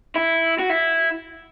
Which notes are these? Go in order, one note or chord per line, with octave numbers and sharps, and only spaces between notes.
E4
F#4
E4